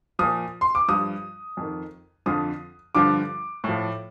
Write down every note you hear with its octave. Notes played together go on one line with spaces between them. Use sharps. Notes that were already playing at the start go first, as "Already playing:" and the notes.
A#2 F3 D#6
C6
D6
G2 F3 D#6
F2 D#3
F2 D3 F3 D#6
G2 D3 F3 D6
A2 F3